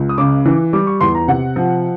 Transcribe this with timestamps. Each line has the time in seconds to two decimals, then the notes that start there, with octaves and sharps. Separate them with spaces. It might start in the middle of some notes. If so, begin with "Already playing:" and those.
Already playing: C#2
0.09 D#6
0.18 C#3 D6
0.46 E3
0.73 G3 D6
0.87 C#6
1.01 E2 C6
1.15 A#5
1.28 C3 F#5
1.56 F3